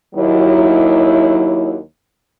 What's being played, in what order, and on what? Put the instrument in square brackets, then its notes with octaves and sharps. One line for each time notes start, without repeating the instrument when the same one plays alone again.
[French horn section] D#2 F#3 E4